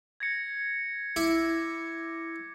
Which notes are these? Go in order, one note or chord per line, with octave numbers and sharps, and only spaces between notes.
G#6 A#6 C#7
E4 D6